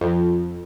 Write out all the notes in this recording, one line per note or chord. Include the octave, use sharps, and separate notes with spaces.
F2